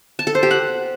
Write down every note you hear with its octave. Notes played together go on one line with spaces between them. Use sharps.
A5
A4
C5
G4
F#5